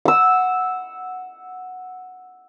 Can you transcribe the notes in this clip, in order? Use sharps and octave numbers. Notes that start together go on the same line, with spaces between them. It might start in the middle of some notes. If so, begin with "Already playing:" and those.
F#5 E6